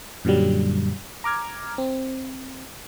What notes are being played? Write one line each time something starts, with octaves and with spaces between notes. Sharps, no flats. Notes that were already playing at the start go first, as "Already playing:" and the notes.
F#2 A#2 D3 F#3 G3
A#5 D6 F6 G#6
C4